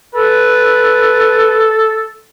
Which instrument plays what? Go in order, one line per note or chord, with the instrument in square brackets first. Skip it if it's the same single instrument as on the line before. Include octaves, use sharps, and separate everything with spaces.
[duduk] A4 [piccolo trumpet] B4